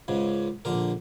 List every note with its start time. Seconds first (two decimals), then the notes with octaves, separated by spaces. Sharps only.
0.08 C#2 G#2 C#3
0.65 A#1 D3 A#4